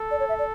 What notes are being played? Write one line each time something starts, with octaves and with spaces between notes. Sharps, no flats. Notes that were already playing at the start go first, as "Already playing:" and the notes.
Already playing: A4
D5
C#5
E5
D5